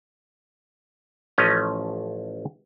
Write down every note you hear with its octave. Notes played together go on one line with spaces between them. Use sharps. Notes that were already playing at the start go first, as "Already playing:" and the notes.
A1 F3 A3 C#4 D#5 A#5